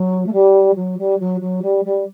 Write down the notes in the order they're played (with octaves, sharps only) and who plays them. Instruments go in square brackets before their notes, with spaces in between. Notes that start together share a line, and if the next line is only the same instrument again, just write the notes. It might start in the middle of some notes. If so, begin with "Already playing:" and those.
Already playing: [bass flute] F#3
A3
G3
F#3
G3
F#3
F#3
G3
G3